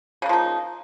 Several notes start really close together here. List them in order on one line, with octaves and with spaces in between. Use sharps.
C#3 A#3 F3 D#4